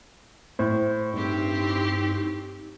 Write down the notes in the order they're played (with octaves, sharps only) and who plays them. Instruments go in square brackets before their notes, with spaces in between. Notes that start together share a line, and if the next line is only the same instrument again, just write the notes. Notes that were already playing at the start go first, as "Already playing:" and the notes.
[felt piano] A2 [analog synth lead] C5
[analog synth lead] G2 [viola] C4 G4 [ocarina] D#4